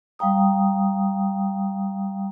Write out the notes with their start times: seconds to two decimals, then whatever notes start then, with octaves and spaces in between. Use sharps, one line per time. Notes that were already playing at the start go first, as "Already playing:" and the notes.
0.19 G3 F5 G5 A#5 D#6